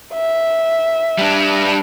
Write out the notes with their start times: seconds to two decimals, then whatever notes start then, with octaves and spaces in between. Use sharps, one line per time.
0.14 E5
1.18 G3 D4